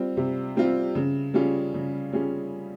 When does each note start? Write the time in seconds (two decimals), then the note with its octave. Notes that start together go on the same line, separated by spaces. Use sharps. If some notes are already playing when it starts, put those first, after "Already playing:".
Already playing: G3 C4 F4
0.17 C3
0.56 G3 C4 F4
0.95 C#3
1.34 G3 C#4 F4 G#4
1.74 C#3
2.13 G3 C#4 F4 G#4